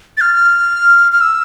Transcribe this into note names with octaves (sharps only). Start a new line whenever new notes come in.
A6
F6
F6
E6